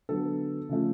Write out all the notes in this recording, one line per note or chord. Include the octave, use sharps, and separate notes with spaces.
D3 F#3 B3 A4
C#3 F3 A3 C#4